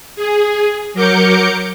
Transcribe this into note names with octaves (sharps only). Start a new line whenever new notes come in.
G#4
F#3 A#4 D6 G6 C#7